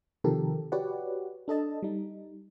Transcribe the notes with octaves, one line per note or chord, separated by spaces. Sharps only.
C3 D#3 F3 G4 A4 A#4
F#4 G4 B4 C#5 D5 F#5
D4 A4 D#5 A5
G3 D#4